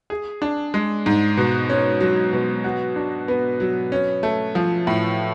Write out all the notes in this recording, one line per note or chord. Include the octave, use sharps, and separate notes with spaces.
G#4
D4
G#3
G#2
B2
C#4
F#3
B2
F#4
D4
B3
F#3
C#4
A3
F3
A2